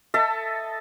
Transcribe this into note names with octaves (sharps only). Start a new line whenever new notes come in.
A4 D#5 E5 A5